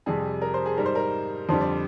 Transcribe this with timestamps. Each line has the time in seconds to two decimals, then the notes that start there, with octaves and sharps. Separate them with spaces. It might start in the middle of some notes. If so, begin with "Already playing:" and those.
0.06 F2 C3 G3 G#4
0.42 A#4
0.54 C5
0.66 G#4
0.77 G#2 G3 A#4
0.86 C5
0.95 A#4
1.49 F2 D3 G3 C5
1.61 D5